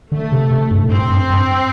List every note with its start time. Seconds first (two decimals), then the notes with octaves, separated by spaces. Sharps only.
0.11 D3 A3
0.32 C3
0.51 C3
0.71 G2
0.84 A2
0.90 G2 C4
1.10 G2
1.30 G2